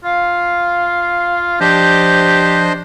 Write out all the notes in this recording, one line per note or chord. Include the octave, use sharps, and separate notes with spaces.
F4 F5
F3 D4 G4 C5 D#5